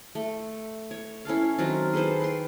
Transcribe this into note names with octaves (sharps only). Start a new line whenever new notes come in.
A3
C#5
C#4 E4 A4 F5
D#3 F#3 C4 F4
G#4 A4 B4 C5
B4 G5 C6